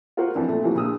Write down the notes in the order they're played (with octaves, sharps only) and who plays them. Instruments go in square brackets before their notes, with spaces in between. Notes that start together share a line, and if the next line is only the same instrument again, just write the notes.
[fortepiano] F4 F#4 A#4 C5 F#5
F2 E3 D4
A#2 A3
C3 E3 F3 A#3 E4 F#4
A#1 A#2 D#6 E6